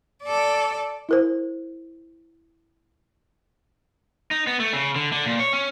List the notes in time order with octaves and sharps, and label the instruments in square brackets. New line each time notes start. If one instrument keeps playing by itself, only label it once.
[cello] A4 D5
[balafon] E4 A#4 C5
[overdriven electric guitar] D#4
B3
A3
C#3
D3
D3
A#2
C#5
C#4